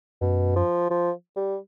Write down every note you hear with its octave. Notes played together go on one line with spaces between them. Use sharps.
F#2 B2
F3
F3
G3